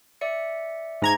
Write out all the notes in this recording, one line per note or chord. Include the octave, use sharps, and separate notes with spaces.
D5 E5 C#7
G#2 A#5 G#6